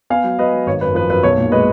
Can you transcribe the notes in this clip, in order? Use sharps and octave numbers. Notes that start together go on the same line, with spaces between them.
B3 F5 G#5
F#3
F#3 B4 D#5
F#3
G#1 C#5
F#2 B4
F3 B4
F#2 B4
B1 C#5
A#2
G#3 B4 D#5